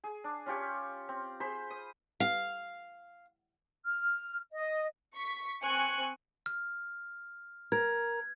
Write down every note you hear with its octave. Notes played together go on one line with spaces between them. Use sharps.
G#4
D4
C#4 F4 G4 C#5
C4
G#4 C5 B5 C6
D#6
F5
F6
D#5
C#6 B6
C4 G#5 C#6 F#6 C#7
F6
A#4 G#6